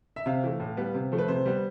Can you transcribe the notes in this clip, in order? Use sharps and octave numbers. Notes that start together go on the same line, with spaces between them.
E5
C3 F5
E3 A3
A2
G3 B3
C3
F3 A3
B4
C3 C5
G3 B3